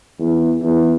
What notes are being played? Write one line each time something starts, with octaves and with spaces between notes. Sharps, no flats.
E2
E2